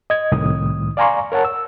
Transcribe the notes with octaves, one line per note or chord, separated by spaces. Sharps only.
D#5 G#6
C2 A2 D#3 D#6
D5 F5 G#5 A#5 C6 C#6
A#4 C#5 F#5 A5
E6